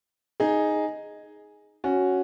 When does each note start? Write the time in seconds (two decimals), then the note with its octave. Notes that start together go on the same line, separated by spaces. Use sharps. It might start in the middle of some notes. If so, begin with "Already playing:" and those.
0.40 D#4 G#4
1.84 C#4 F#4